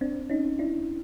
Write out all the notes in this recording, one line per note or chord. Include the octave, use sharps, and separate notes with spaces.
C4 D4
C#4 D#4
D4 E4